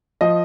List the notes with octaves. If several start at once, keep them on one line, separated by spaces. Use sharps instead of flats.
F3 D#5